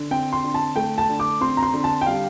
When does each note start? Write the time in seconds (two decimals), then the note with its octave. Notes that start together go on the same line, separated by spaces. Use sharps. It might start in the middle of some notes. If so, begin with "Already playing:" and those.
Already playing: D3
0.11 C4 G5
0.32 C6
0.44 D3
0.54 A5
0.76 A3 G5
0.98 A5
1.09 D3
1.19 D6
1.41 C4 C6
1.57 A#5
1.63 C6
1.73 D3
1.84 A5
2.01 G5
2.06 G3 F5